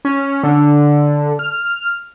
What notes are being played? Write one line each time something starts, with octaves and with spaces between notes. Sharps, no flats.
C#4
D3
F6